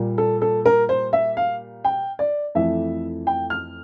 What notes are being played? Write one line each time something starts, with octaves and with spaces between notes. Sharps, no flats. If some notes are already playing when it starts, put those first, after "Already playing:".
Already playing: A#2 G3 A#3
A4
A4
A#4
C5
E5
F5
G5
D5
F2 E3 A3 E5
G5
F6